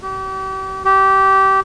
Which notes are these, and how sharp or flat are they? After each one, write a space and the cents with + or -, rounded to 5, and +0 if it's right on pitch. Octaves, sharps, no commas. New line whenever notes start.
G4 -40
G4 -20